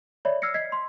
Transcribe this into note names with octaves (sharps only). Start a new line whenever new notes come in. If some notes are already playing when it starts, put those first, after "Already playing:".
C#5 D5 E5 B5
E6 F6 G#6 A#6 C7 C#7
D#5 G#6 B6 C7
C6